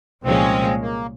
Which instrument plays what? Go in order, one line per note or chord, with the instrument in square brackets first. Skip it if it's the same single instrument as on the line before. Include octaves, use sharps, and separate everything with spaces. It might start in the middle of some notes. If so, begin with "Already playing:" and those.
[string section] C2 A#2 F3 G#3 C#4 [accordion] C4
[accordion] A#3